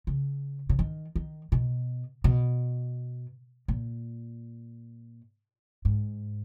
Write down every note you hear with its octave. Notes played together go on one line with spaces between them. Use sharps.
C#3
C#3
D#3
D#3
B2
B2
A#2
G#2